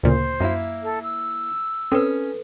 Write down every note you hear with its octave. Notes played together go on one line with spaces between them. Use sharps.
D2 A#2 C#3 C5
F#2 A#3 E4
A4
E6
C4 C#4 A4 B4